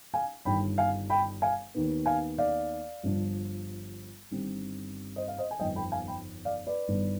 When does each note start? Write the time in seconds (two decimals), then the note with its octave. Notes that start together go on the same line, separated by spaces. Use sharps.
0.14 F5 G#5
0.45 G1 G2 D#3 G5 B5
0.78 F5 G#5
1.10 G5 B5
1.42 F5 G#5
1.74 D#2 D#3 B3
2.06 F5 G#5
2.38 D5 F5
3.03 G1 G2 F3
4.31 G1 G2 D#3 G3 C4
5.16 C5 D#5
5.28 F5
5.38 C5 D#5
5.51 G#5
5.59 G1 F2 D#3 B3 D#5 G5
5.76 G5 B5
5.92 F5 G#5
6.07 G5 B5
6.45 D5 F5
6.67 B4 D5
6.88 G1 G2 D#3 B3